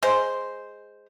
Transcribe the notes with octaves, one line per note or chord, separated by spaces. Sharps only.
G#3 C5